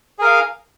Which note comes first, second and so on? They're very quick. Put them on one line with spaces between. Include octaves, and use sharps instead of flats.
G#4 A#4 F5